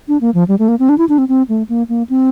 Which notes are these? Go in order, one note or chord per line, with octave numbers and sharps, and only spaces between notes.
D4
A#3
F3
G3
A3
A#3
C4
D4
E4
D4
C4
C4
A3
A#3
A#3
C4